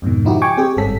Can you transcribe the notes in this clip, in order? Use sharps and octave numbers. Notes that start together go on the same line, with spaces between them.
F2 G#2 B2 D#3
C#3 F3 D#4 E4 F#4 G4
G5 G#5 C#6 D6
C4 G4 G#4
G1 G#2 G3 C#4 A4 B6